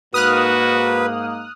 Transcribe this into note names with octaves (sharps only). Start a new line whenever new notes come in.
G#2 A#3 F#4 B4 D#6 F6 F#6